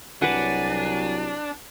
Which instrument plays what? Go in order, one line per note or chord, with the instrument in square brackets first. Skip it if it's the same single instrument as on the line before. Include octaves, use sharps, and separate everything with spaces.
[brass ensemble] C2 F#3 [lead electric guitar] D4 [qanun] B4 F#5 [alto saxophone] G#5